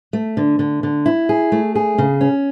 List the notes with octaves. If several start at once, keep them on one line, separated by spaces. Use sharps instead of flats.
A3
D3
D3
D3
E4
G#4
A3
G#4
C#3
C#4